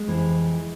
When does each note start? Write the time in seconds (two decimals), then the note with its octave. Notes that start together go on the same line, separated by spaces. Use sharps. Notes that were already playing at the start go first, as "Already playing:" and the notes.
Already playing: G#3
0.08 F2 C3 E3